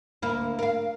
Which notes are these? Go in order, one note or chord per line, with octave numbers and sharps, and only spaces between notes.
D2 A#3 E4
A#4 F5